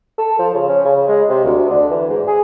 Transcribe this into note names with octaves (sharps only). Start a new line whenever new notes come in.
A4
F3
C#3
C#4
C#3
G#3
C3
D2
D3
E3
G#2
G#4